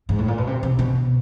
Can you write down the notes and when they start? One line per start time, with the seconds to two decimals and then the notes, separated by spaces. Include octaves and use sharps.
0.09 G#2
0.19 A2
0.28 A#2
0.38 B2
0.47 C3
0.63 C3
0.79 B2